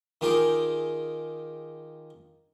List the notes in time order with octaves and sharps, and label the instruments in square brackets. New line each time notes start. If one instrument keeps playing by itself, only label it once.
[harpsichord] D#3 F4 G4 G#4